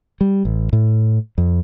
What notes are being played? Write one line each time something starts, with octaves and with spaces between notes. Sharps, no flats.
G3
A1
A2
F2